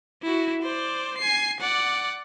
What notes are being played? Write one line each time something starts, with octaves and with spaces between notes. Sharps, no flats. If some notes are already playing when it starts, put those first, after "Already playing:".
E4 F#4
C5 D5
G#5 C7
D5 F#5